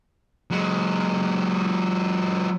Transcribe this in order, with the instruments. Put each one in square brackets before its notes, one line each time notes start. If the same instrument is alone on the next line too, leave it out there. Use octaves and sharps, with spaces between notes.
[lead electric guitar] F#3 G#3